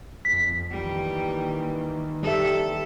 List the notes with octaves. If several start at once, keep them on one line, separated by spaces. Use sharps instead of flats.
F2 B6
D#3 E3 G3 A#3
G3 A4 E5